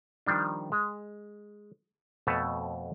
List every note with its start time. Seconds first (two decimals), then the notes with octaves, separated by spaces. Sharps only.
0.26 D#3 F3 G3 D4
0.72 G#3
2.27 F2 B2 A3 B4 C#5 A5